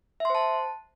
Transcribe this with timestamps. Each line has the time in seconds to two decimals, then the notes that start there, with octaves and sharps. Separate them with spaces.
0.20 E5
0.25 C6
0.30 C5
0.35 A5